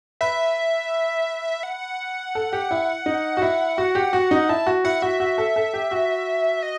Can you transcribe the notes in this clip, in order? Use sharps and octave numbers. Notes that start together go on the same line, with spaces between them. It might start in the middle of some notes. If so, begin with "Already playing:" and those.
B4 E5
F#5
A4
G4
E4
D#4
F#4
E4
F#4
G4
F#4
D#4
E4 A5
F#4
E4 F#5
F#4 E5
F#4
A4
A4
G4
F#4
D#5